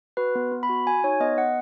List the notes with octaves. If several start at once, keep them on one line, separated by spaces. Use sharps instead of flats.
F#4 B4
B3
B3
B5
F#4
F#4 G#5
D#4 C#5
B3 D#5
B3 F#5